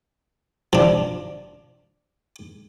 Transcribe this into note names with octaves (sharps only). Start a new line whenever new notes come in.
F3 D4